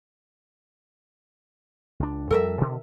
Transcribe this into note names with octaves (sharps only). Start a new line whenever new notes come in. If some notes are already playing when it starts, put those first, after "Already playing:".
C#2 D4
F2 G3 A4 A#4 E5
B2 D3 D#3